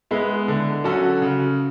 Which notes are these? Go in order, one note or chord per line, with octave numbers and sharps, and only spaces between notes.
G#3 B3 E4
D3
F#3 C#4 F#4 A4
C#3